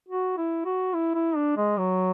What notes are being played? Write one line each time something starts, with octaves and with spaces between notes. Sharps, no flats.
F#4
E4
F#4
E4
E4
D4
G#3
F#3